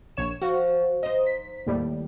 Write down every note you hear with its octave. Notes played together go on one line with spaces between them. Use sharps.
A#1 C#5 E7
F3 F#4
D#4 C5 D#5
B6
D#2 A2 G3